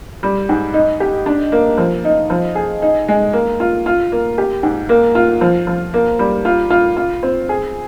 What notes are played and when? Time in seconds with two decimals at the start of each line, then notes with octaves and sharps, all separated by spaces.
0.23 G3
0.49 G#2
0.74 D#4
1.00 G4
1.26 D4
1.52 A#3
1.78 F3
2.05 D#4
2.30 F3
2.55 G#4
2.82 D#4
3.08 G#3
3.33 A#3
3.60 F4
3.86 F4
4.12 A#3
4.38 G4
4.63 G#2
4.89 A#3
5.15 F4
5.41 F3
5.67 F3
5.94 A#3
6.19 G3
6.45 F4
6.70 F4
6.97 F4
7.23 C4
7.49 G#4